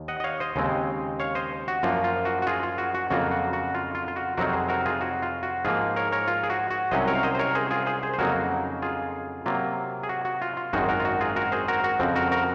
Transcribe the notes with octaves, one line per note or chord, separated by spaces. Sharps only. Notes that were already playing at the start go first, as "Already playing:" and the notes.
Already playing: D#2 D#3
D#5 F#5
D#5
C#5 F5
C5 D#5
D#2 C#3 G#3 C4
C#5 F5
C5 D#5
F#4
F#2 F3 A#3 F4
F4
F#4
F#4
F4 G#4
F4
F#4
F#4
F2 C#3 F#3 A#3 F4 F#4
F#4
F#4
F4
F4
F4
F#4
F2 C3 F#3 C4 D#4 F#4 A#4
G#4 C5
F#4 A#4
F4 G#4
F#4
F4
F#4
G#2 F3 A#3 F4 G#4
A#4 C#5
A#4 C#5
F4
G#4
F#4
F#4
C2 C3 F#3 C#4 C5 D#5
A#4 C#5
F5
C5 D#5
C5
A#4 C#5
G#4 C5
F4 G#4
G#4 C5
G#4 C5
C5
F2 C#3 F#3 A#3 D#4 F#4 A#4
F4 G#4
C3 F#3 A#3 F4
G#4
F#4
F#4
F4
F4
G#1 F#2 D#3 G#3 D#4 F#4
F#4 A#4
F4
F#4
F4 G#4
F#4 A#4
G#4 C5
F#4 A#4
F#4
F2 C#3 F3 C4
F#4 A#4
F#4 A#4